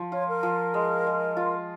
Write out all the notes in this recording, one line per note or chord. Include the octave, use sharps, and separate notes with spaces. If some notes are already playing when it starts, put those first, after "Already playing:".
Already playing: F3
F4 C#5
A#4
F3
G#3
G#3
F4